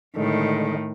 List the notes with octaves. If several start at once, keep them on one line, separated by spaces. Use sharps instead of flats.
A2 D3 D#3 G#3